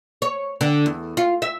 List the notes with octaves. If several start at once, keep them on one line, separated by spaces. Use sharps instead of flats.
C#5
D3
E2
F4
E5